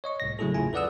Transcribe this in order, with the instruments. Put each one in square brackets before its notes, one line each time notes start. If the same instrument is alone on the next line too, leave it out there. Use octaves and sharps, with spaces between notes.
[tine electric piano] C#5 D#5 C#6
C2 A2 A#6
C#3 F#3 A3 E4 G#4 A4
G#1 D#2 C#3 E4 F4 G#5
A4 B4 D5 F#5 D#6 E6